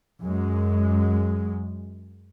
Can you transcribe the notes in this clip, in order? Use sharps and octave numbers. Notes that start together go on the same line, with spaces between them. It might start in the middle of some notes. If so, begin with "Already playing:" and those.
F#2 G#3